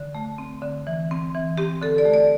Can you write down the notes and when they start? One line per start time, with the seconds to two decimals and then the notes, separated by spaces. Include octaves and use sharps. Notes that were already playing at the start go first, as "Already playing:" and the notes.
Already playing: D3
0.15 A3
0.38 C4
0.62 D3
0.87 E3
1.11 C4
1.34 E3
1.58 C4 G4
1.81 D3 A4
1.98 D5
2.05 A3
2.13 D5